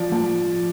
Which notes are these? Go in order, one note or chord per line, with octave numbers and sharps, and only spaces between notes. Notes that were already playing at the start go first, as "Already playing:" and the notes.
Already playing: F3 D5
F3